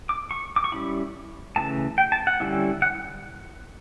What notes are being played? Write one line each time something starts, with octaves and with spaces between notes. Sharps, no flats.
D6
C#6
D6
C#6
G3 C#4 E4 B5
C#3 E3 A3 A5
G5
A5
F#5
D3 G3 C#4 E4
F#5